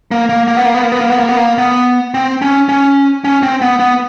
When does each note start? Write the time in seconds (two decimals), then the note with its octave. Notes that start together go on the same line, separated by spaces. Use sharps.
0.11 A#3
0.29 A#3
0.48 A#3
0.57 B3
0.65 A#3
0.74 B3
0.83 A#3
0.92 B3
1.01 A#3
1.10 B3
1.20 A#3
1.29 B3
1.37 A#3
1.58 B3
2.14 C4
2.42 C#4
2.69 C#4
3.24 C#4
3.43 C4
3.62 B3
3.80 B3